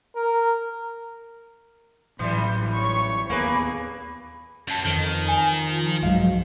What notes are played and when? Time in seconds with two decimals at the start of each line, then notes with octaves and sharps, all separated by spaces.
0.16 A#4
2.19 A1 A2 E3 F#3 G3 C6
2.74 C#5 C#6
3.30 D#2 A#3 B3 G#4 B4
4.68 F#2 B4 A5
4.85 F2 D#3
5.27 G#4 G#5 A#5
5.52 F3
6.02 B1 G#2 F3 F#3 D#5 F5